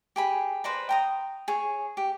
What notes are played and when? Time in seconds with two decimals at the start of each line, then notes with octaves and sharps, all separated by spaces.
0.16 G4 G#4 B5
0.64 B4 C5 D5 A#5
0.89 G5 A#5 D#6
1.48 G#4 C#5
1.97 G4